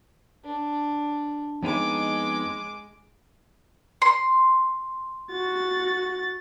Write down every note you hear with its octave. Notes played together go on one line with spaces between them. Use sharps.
D4
F2 G#3 B3 D#4 D6
C6
F#4 A6